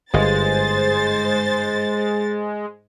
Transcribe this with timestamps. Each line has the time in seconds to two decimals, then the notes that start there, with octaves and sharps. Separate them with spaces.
0.14 G1 G#2 G#3 C5 A6